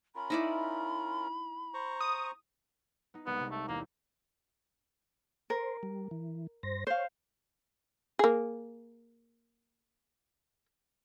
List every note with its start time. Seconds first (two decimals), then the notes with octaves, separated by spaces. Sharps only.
0.15 C#4 F4 A#4 B5
0.30 D#4 E4 D5
1.74 C5 A#5 C#6
2.01 D#6
3.14 B3 D#4
3.27 C2 G#3 B3
3.40 C3
3.51 A3
3.68 E2 A#3
5.50 A#4 C5
5.83 G3
6.11 E3
6.63 G2 C5 A#6
6.87 C5 C#5 F5
8.19 A#3 G#4